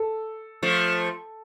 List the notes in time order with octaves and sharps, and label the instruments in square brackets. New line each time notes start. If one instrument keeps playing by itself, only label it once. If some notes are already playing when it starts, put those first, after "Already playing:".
Already playing: [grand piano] A4
[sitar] F3 A3